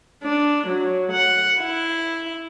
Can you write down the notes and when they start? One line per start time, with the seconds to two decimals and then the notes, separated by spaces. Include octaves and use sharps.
0.24 D4
0.68 F#3
1.13 F#5
1.61 E4